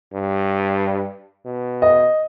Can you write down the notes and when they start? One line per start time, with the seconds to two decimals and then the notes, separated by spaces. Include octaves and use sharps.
0.13 G2
1.45 B2
1.82 D#5